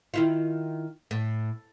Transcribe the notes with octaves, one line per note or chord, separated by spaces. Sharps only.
D#3 E4 F4
A2